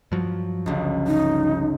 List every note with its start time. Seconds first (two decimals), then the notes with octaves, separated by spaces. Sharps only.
0.12 G2 F3 F#3
0.66 G1 C#2
1.07 D#4